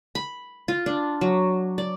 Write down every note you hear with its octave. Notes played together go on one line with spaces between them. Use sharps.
B5
F4
D4
F#3
D5